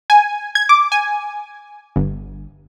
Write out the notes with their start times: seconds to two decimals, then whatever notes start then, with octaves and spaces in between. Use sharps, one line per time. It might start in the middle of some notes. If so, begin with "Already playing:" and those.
0.10 G#5
0.55 G#6
0.69 D6
0.92 G#5
1.96 G1